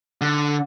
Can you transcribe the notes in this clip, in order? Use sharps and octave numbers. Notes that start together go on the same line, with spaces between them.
D3